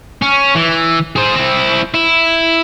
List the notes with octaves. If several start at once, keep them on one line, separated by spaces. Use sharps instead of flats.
C#4
E3
G#4 C5
C4 E4
E4